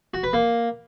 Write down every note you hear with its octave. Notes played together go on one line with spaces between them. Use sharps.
F#4
B4
A#3